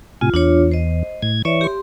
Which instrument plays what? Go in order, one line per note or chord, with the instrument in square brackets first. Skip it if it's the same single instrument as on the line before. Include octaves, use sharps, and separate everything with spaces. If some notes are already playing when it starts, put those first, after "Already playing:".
[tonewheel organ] A2 C3 G#5 [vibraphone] F4
[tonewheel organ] E2 [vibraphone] D4 F4 C#5
[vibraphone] C5 D#5
[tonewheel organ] A2 G#6
[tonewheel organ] E3 C#6 [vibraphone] C#5 D5 E5
[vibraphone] G4 C6